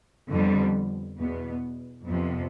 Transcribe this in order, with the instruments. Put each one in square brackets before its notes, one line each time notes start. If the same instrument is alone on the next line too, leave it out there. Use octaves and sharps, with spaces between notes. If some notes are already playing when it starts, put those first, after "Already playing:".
[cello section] F2 D3 G3 B3
E2 B2 B3
F2 C3 F3 B3